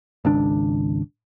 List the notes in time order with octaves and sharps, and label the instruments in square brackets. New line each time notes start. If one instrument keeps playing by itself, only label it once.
[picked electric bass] G#1 C#2 D4